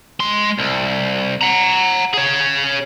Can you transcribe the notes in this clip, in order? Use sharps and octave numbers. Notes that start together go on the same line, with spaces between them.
G#3 C6
C2
F#5 A#5
G#4 C#5